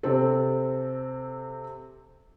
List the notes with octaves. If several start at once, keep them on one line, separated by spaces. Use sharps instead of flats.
C3 C4 A4